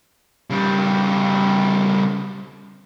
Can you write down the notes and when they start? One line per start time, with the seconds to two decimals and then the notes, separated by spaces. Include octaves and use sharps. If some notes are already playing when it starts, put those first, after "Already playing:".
0.50 C#3 G3